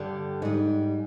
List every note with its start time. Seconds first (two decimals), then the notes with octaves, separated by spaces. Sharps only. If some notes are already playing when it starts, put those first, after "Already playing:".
Already playing: G2 D3 G3
0.42 G#2 G3 D#5